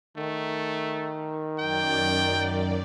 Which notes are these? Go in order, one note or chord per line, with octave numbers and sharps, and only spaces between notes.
D#3 A3
F#2 D5 G5